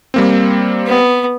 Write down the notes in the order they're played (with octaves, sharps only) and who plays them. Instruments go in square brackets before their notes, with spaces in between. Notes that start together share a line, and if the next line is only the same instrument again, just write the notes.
[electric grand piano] G3 A#3 C4
[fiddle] B3